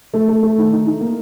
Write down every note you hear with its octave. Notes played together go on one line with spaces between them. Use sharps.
A3
A3
A3
D#3
D#4
D#4
A#3